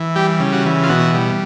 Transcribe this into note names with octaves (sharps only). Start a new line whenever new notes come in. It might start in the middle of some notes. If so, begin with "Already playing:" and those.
Already playing: E3
G3 G4
C#3
F#4
E3
F4
B2 F#4
G3